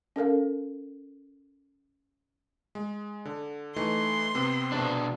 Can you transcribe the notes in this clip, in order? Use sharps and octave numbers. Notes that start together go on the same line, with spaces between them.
C#4 A4 A#4 F5
G#3
D3
E3 A3 D#4 C6
C3 B3 C4
B2 D4